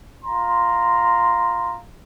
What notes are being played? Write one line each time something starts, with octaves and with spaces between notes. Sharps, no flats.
F4 A#5 C6